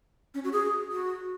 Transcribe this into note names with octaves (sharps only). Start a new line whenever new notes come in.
C#4
F#4
G#4
F#4